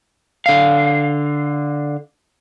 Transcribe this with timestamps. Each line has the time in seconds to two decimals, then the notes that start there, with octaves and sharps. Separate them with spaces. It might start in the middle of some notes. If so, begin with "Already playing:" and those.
0.46 D3 F5